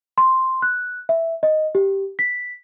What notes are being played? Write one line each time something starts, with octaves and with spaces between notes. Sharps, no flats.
C6
F#6
E5
D#5
G4
B6